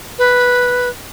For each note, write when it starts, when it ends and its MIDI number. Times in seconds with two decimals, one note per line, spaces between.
0.19 0.89 71